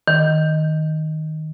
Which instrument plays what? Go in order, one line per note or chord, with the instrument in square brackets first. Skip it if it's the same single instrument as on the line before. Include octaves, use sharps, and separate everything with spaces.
[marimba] D#3